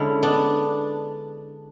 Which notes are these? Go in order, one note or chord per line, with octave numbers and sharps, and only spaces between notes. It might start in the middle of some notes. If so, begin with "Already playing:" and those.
Already playing: D3 G#3 C#4 E4
B3 D4